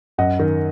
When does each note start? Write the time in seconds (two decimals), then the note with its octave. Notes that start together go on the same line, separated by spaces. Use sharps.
0.18 F#2 D#5 F#5
0.39 D#3